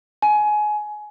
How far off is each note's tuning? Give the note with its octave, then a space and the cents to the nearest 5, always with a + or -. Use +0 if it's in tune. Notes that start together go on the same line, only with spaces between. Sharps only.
G#5 +25